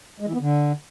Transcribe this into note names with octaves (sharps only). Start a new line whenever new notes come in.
G#3
E3
B3
D3